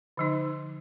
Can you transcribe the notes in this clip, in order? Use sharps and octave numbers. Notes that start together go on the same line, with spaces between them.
D3 F3 D#4